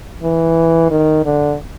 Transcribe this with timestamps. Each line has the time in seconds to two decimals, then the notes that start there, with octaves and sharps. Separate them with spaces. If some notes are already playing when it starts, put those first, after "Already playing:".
0.23 E3
0.91 D#3
1.25 D3